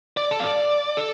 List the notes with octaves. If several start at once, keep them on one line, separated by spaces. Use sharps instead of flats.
D5
A4
F5
D5
A4